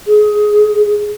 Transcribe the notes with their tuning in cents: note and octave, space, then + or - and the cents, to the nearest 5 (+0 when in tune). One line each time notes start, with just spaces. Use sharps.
G#4 +20